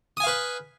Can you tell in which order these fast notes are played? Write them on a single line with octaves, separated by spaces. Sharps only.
D#6 G#5 F5 B4